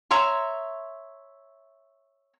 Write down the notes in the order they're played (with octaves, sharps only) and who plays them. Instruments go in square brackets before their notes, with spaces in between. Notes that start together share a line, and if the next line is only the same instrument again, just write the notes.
[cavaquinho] C#5 E5 A#5 C6